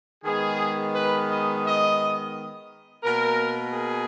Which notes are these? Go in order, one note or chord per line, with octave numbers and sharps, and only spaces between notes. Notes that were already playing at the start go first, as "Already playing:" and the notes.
D#3 G#3 B3 G#4
B4
D#5
D#5
B2 A#3 A#4
G#4